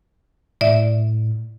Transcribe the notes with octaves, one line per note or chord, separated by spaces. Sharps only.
A2 D5 E5